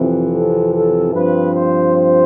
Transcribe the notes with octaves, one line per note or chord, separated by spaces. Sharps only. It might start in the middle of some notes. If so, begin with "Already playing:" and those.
Already playing: F2 C3 E3
A4
A4
G2 F3 C4 B4
C5
C5